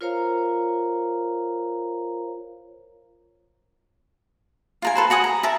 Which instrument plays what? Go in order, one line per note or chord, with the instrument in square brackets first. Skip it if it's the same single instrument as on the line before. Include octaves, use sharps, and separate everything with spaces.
[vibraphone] F4 A#4 C5 C#5 F5 A#5
[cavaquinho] F4 A#4 G#5
A4 B4 C5
F#4 F#5 G#5 D#6
A#5
A#4 E5 A5